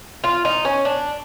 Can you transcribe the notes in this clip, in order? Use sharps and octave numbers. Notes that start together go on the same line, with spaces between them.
F4
D#4
C#4
D4